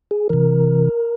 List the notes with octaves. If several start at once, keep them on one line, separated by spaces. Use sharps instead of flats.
G#4
C3 E3 A#4